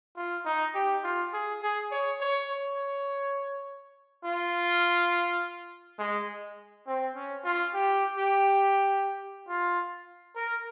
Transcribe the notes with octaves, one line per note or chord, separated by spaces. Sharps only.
F4
D#4
G4
F4
G#4
G#4
C#5
C#5
C#5
F4
G#3
C4
C#4
F4
G4
G4
F4
A#4